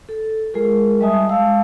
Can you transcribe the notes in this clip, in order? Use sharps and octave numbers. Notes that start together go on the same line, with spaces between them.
A4
G#3 F4 G#4 A#4
G3 D#5 E5 G#5 A5 D#6
G#3 F5 A5 E6